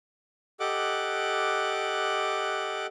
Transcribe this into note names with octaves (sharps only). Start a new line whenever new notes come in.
G4 A4 D#5 F#5 D6 F#6